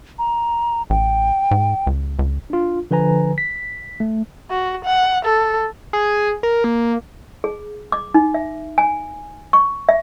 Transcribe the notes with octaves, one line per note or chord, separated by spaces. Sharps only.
A#5
A1 G5
G#2
C#2
C#2
D4 F4
D3 F3 B4 G#5 A#5
B6
A3
F#4
F#5
A4
G#4
A#4
A#3
G#4
D6
D#4
E5
G#5
C#6
E5